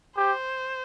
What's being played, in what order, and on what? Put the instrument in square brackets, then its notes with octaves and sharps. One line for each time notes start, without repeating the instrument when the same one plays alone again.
[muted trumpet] G4 [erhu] C5